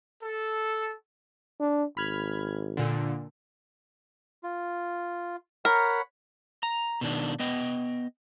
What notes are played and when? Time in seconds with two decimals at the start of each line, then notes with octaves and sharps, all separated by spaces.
0.22 A4
1.60 D4
1.97 G#1 B5 F6 G#6
2.77 A#2 D3
4.43 F4
5.65 A#4 C#5 F#5 B5
6.63 A#5
7.01 B2 D#3 D4
7.39 B3 D#5 G5